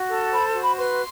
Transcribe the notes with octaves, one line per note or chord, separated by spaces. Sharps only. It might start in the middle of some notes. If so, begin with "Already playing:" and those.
Already playing: F#4
A4
C5 B5
F#4
B5
B4 C6